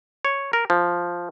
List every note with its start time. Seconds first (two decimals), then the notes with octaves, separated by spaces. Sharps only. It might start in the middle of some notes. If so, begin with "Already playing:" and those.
0.25 C#5
0.53 A#4
0.70 F3